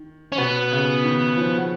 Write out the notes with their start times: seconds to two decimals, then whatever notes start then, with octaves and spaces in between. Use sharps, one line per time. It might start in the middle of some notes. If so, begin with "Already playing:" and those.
Already playing: D#3
0.32 C#4
0.38 B2 B3
0.71 C#3
1.04 D#3
1.37 F3